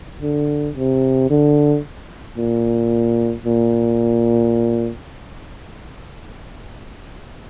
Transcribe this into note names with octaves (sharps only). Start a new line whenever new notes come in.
D3
C3
D3
A#2
A#2